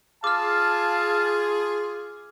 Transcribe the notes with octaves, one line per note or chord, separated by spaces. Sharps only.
F4 G#4 F5 A5 D6 F6